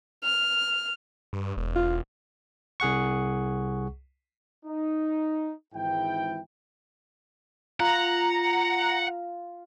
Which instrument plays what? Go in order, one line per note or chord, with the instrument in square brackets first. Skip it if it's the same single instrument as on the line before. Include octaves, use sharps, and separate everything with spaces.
[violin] F6
[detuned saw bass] G2
E1
[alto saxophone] F4
[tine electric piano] C2 G#4 F#5 C#6
[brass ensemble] D#4
G#1 G#2 E3 E4 G5
[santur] F4 [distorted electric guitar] F#5 [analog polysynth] A#5